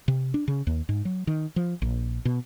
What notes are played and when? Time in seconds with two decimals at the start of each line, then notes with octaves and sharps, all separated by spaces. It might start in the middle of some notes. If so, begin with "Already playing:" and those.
0.08 C3
0.34 D4
0.48 C#3
0.67 D#2
0.89 G#2
1.05 F#3
1.27 D#3
1.56 F3
1.82 A#1
2.25 B2